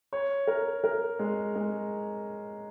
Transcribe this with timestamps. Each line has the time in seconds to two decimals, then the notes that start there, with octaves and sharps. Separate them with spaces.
0.13 C#5
0.47 A#4
0.84 A#4
1.19 G#3
1.55 G#3